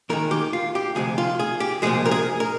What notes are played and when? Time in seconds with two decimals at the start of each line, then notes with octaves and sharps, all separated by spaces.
0.09 D#2 D#3 G#3 A#4
0.31 G4
0.53 F4
0.75 G4
0.95 D2 C3 F3 G#3 G#4
1.18 F4
1.39 G#4
1.60 G4
1.82 C2 A#2 F3 G#3 G#4
2.05 A#4
2.11 G#4
2.40 A#4